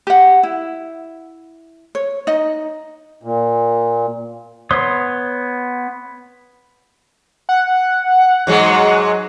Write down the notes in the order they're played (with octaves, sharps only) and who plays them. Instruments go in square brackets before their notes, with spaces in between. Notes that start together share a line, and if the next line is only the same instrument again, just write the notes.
[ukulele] G4 F#5
E4
C#5
D#4 D#5
[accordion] A#2
[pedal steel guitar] B3 C#5 C6 D#6
[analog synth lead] F#5
[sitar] G#2 F#3 G#3